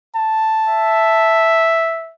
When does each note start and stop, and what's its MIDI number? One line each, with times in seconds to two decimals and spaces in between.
0.15 1.87 81
0.67 2.13 76